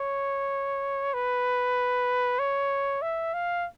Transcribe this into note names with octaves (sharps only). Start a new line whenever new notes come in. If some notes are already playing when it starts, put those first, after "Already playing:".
Already playing: C#5
B4
C#5
E5
F5